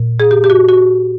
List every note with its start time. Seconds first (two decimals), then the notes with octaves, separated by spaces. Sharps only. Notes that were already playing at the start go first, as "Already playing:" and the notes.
Already playing: A#2
0.20 G#4
0.31 G4
0.44 G4
0.50 F#4
0.69 F#4